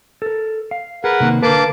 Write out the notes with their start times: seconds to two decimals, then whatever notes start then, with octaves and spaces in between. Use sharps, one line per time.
0.22 A4 A#4
0.71 F5
1.04 G#4 A#4 B4 F#5
1.20 C3 D#3 A#3
1.43 D3 A#3 B4 A5 D6